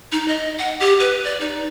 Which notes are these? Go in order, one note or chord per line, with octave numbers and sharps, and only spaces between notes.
D#4
D#5
F#5
G4
B4
D5
D#4